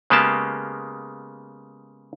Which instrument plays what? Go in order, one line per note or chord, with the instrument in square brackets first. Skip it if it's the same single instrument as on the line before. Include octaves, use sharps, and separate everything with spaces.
[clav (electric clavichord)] C#3 G#3 A#3 B3 G4 A5